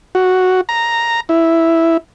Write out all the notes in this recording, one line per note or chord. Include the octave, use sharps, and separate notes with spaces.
F#4
A#5
E4